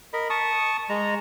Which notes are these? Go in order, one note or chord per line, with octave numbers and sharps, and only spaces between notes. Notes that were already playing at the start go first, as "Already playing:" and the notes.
A#4 D#5 B5
A5 C#6 D#6
G#3 A#5